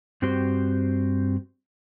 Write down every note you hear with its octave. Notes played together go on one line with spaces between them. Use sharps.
G2 C4 F#4 G4 C5